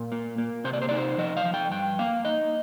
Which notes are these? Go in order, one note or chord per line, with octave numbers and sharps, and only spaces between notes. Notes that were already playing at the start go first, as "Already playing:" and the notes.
Already playing: A#2 A#4
A#3
A#3
C3 C5
D5
C5
D#4 D5
C5
F3 D#5
F5
F3
G5
G2 G5
A#3 F5
D#4 D#5